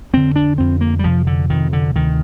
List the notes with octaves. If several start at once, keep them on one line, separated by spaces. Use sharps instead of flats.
F2 D3 C4
D4
F2 D3 C4
A#3
G3
F2 C3 F3
D3
F2 C3 D#3
D3
D2 C3 D#3